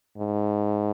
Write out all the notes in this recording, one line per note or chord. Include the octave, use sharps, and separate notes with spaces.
G#2